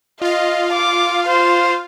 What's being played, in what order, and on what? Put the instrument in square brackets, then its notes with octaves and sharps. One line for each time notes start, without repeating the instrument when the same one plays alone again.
[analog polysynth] F4 F5 [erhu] D#5
[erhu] D6
C5